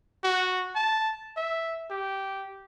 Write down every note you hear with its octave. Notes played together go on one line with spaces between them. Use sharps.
F#4
A5
E5
G4